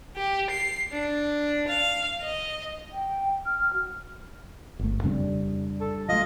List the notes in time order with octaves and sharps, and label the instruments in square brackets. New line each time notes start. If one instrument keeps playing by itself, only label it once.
[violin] G4
C7
D4
F5
D#5
[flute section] G5
F6
F#4
[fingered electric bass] G1 A3
[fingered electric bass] F2 C#3 C4 [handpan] G3 D4
[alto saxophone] A4
[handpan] F#3 A3 [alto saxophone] F4 [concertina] D#5